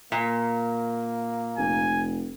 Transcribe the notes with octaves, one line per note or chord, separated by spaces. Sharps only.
A#2 A#3
F1 G#5